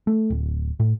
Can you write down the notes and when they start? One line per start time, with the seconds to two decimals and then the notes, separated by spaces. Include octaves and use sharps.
0.07 A3
0.30 D1
0.80 A2